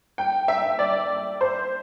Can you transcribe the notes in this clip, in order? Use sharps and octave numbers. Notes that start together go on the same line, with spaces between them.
G5
E5
D5
C5